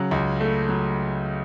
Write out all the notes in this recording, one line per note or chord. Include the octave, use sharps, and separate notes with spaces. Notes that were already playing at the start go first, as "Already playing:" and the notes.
Already playing: C#3 F#3
C#2
A3
F#3